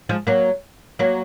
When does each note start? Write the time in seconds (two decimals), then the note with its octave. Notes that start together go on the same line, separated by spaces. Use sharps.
0.09 F3 G#3
0.27 F#3 A#3
0.99 F#3 A#3